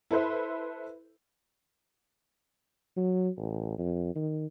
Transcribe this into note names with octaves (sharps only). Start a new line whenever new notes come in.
E4 A4 B4 C5 E5
F#3
A1
F2
D#3